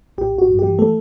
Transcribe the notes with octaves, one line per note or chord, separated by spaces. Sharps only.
A1 G4
A1
F#4
G2
E3 G4
A3 A4